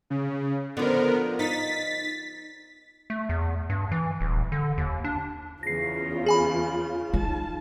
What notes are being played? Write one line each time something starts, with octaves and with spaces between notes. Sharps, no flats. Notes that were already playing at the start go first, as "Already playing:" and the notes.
C#3
D3 F3 B3 A#4
D#4 A6 B6
A3
E2
G2
E3
D#1
D3
D#2
D4
E2 C#3 F4 A#6 C7
G#4 G#5 B5
D#4 A5